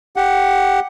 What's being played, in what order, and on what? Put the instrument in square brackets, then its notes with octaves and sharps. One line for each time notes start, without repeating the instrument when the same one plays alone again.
[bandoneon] G4 F#5